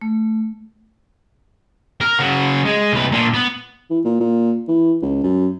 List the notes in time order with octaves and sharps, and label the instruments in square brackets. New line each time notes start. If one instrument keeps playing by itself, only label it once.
[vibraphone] A3
[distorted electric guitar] A#4
C#3 F#4
G#3
C2 B4
A#2 D4
B3
[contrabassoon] E3
A#2
A#2
E3
C#2
F#2